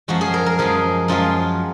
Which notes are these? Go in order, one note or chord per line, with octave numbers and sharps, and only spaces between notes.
F#2 F3 G#3 F#4
G#4
A#4
A#4
F#2 F3 G#3 G#4
F#2 F3 G#3 F4